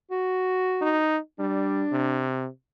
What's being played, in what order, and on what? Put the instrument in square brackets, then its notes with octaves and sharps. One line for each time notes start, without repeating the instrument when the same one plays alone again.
[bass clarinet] F#4
[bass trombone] D#4
[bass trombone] G3 [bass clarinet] D4
[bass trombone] C3